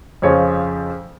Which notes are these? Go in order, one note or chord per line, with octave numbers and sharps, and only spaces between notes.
F2 C#3 F3 C#5